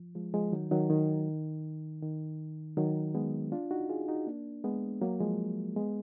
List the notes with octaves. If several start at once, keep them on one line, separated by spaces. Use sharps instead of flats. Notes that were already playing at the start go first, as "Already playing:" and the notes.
Already playing: F3
F3 G#3
F3 G#3
D#3 F#3
D#3 F#3
D#3
D#3
D#3 F#3
G#3 B3
D4 F4
D#4 F#4
F4 G#4
D#4 F#4
A#3 D4
G#3 B3
F#3 A#3
F3 G#3
G#3 B3